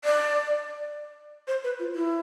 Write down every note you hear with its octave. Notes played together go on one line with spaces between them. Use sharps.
D5
C5
B4
F4
E4